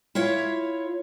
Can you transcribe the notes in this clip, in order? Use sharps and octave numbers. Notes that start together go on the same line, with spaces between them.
E4 F4 C#5 E5